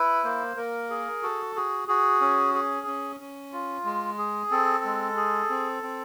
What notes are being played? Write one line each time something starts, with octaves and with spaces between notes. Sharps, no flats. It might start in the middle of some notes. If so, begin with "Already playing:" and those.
Already playing: E4 B4
A#3 C5
A#3 A#4
G#4
F#4 A4
F#4 G#4
F#4 G#4
C#4
G#4
C#4
C#4
F4
G#3
G#4
C4 A4
G#3
G#4
C4
C4